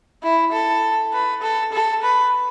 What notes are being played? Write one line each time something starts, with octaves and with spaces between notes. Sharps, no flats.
E4
A4
B4
A4
A4
B4